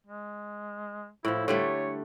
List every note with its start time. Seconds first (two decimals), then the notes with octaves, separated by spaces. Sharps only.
0.07 G#3
1.25 A2 F3 E4
1.48 D3 G3 A3 C#5